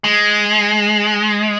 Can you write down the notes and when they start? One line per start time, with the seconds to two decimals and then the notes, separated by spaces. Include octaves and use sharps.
0.04 G#3